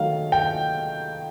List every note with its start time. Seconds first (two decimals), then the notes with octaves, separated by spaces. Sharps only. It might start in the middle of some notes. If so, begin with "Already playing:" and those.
Already playing: D#3 F#3 A3 F5
0.32 G5